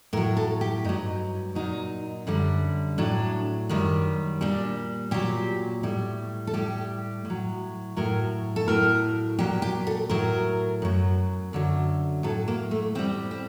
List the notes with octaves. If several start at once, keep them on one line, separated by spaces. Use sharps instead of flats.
A2 F#3 A#4
A4
G4
G2 F#3 D#4
A#2 F#3 D#4
F#2 D3 G3
A2 F#3 D4
F#2 D#3 G3
A#2 G3 D4
A#2 F#3 G4
A2 G3
A4
A2 G3 G4
A2
F#3
A2 F#3 A#4
A4
A2 F#3 A#4
A#2 F#3 G4
G4
A4
A2 F#3 A#4
F#2 F#3
F#2 D3 F#3
A2 F#3 A4
A#3
A3
A2 G3 C4
C4